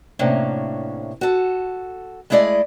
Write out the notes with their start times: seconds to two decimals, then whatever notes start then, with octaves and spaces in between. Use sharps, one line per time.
0.19 A2 C3 A#3 C#4 D4
1.21 F#4 A4
2.30 G#3 A3 E4 G#4 D5 D#5